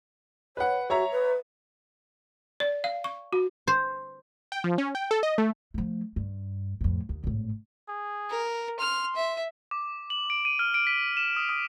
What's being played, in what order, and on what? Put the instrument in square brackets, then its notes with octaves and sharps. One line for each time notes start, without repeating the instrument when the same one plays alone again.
[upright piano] B4 F#5 [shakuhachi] C#5
[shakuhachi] F#4 [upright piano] C#5 E5 A#5
[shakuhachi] B4
[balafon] D5
F5
C#6
F#4
[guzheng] C5
[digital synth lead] G5
F3
C#4
G5
A4
D#5
A3
[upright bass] F3 A3
G2
F2 A2
D#2
G#1 A2
[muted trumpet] G#4
[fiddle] A#4
[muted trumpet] C6 [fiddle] F6
[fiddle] E5
[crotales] D6
F#7
D7
D#7
F6
D7
B6
E7
D#6
D#6